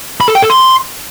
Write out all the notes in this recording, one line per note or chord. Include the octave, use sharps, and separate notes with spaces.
B5
A4
G5
A4
C6